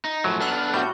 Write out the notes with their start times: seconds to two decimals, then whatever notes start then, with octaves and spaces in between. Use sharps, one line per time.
0.05 D#4
0.24 F#2 A2 F3 F#3
0.40 B3 D4 A4 F6 F#6
0.74 A2 G3 F#4 G6